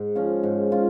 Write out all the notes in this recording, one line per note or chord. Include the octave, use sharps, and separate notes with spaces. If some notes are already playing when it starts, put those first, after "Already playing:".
Already playing: G#2
F3 C#4 F4
G#2
C#4 F4